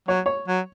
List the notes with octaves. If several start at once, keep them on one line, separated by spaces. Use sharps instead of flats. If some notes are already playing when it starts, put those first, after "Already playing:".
F#3 C#5
C#5
F#3